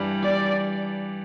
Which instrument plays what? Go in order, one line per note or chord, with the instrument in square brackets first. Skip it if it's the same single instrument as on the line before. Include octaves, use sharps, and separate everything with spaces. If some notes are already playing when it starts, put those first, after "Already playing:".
Already playing: [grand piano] G2 E3 G3 D4
[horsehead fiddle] D5